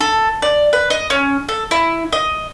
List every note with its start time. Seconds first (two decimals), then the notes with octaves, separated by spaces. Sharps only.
0.01 A4
0.42 D5
0.73 B4
0.90 D#5
1.10 C#4
1.49 A4
1.71 E4
2.12 D#5